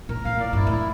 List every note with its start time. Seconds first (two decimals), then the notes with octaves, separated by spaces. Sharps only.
0.09 A#2 A#4
0.25 A#2 F5
0.38 A2 D5
0.53 G2 E4
0.67 A2
0.71 E4